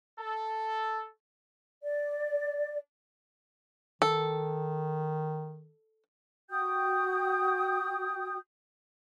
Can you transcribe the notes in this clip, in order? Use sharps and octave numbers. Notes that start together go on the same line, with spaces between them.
A4
D5
D#3 A4
F#4 G5 D#6 G6